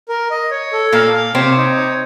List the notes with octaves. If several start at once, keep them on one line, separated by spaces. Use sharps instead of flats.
A#4
D#5
C#5
A4
A#2 A#3 F5
F5
C3 C4 C#5
D#4
C#5